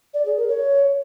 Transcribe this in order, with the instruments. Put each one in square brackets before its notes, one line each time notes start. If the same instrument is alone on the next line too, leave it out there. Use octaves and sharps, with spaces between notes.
[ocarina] D5
G#4
A#4
C#5